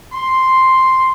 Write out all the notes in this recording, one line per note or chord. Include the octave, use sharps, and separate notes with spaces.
C6